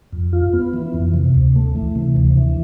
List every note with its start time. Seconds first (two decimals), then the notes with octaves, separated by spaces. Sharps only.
0.12 F2
0.33 F4
0.53 B3
0.74 E3
0.94 F2
1.14 C3
1.34 D2
1.56 A3
1.76 E3
1.96 C3
2.17 D2
2.37 E3